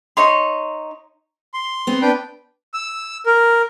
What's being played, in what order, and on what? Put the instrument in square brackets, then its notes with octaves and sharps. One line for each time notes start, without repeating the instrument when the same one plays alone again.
[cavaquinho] D#4 C#5 C6
[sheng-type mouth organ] C6
[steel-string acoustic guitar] B3 C4
[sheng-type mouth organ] D4 B4 G5
E6
A#4